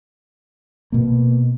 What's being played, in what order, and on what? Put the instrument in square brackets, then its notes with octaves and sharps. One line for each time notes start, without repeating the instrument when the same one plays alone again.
[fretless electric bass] B2 A#3